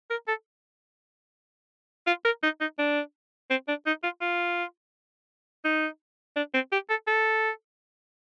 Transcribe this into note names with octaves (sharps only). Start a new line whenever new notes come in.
A#4
A4
F4
A#4
D#4
D#4
D4
C4
D4
D#4
F4
F4
D#4
D4
C4
G4
A4
A4